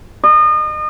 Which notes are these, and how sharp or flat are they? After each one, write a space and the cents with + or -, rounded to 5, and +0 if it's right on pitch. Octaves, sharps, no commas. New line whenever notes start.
D#5 -35